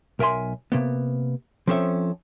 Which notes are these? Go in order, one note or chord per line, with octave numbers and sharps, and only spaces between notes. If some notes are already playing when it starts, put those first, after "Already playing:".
B1 A#4 E5 G#5 C6
C3 A#3 B3
F3 C4 C#4 A4 C#5 E5